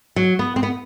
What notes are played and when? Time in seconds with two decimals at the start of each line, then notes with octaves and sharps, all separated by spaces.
0.16 F#3
0.39 B3
0.56 C4
0.63 B3